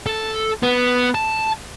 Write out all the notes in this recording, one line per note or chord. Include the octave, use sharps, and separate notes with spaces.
A4
B3
A5